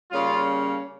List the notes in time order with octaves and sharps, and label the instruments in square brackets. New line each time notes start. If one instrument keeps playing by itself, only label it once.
[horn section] C#3 G3 A#3 C#4 F4